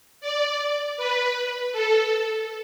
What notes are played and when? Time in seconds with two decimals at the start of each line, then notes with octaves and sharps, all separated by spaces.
0.21 D5
0.97 B4
1.72 A4